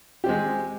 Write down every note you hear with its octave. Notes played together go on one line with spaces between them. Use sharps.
G#3 C4 G4